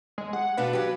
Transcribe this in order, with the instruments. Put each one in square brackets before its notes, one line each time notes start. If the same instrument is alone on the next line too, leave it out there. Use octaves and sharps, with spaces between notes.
[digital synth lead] G#3
[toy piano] G#4 [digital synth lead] F#5
[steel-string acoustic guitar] B2 D4 F#5 [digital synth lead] B4 [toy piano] F5
[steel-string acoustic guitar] F#3 G4 [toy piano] F5 D6